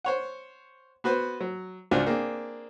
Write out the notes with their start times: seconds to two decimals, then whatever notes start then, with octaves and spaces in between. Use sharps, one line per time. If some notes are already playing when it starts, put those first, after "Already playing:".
0.05 C5 C#5 F#5
1.04 B3 F#4 B4 C5
1.41 F#3
1.91 C#2 D4 F4 F#4 C5 G#5
2.06 A#3 C4 D4 G#4